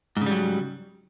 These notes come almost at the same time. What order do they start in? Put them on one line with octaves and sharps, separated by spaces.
G#2 C#3 G3 F#3